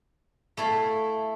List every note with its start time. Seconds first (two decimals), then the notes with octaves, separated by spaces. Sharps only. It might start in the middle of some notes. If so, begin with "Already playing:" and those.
0.57 A3 E4 A4 F5